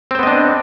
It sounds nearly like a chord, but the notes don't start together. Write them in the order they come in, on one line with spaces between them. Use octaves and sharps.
C4 C5 B3 D#5 D4